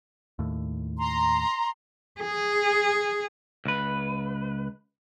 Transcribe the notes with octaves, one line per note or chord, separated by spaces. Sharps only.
D#2 A2
A#5 C6
G#4
C#2 B4